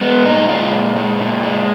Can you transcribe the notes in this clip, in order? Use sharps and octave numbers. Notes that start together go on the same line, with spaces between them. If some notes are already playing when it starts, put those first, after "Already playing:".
G#3 B3
A#2 D#4
G#3 F4
A#2
G#3
A#2
G#3